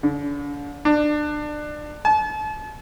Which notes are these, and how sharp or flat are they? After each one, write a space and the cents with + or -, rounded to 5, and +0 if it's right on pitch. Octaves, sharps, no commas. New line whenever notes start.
D3 -35
D4 +25
A5 -40